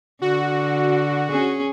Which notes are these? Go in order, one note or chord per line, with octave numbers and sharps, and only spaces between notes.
D3 F#4
C#4 G#4